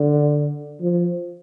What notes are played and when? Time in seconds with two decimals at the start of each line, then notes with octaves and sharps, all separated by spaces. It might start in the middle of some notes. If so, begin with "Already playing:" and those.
Already playing: D3
0.81 F3